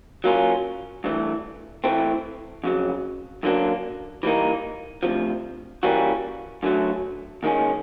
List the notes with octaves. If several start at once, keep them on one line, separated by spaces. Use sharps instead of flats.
F#3 A#3 C#4 F4
G2 E3 A3
A2 E3 A3 C4
F2 C#3 F#3
F#2 D3 F#3 A#3 D4
E3 G3 A#3 D#4
D2 C3 F3
E3 G3 A#3 C#4 F#4
F#2 D3 F#3 A3
D#2 D#3 G#3 C#4